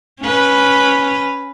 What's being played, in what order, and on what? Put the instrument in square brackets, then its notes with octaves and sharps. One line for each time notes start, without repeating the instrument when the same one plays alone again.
[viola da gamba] C#4 B4